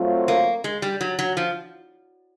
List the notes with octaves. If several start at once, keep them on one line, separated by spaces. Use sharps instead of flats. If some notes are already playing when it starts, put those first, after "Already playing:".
Already playing: F#3 A3 C4 F4
A#3
G#3
G3
F#3
F#3
F3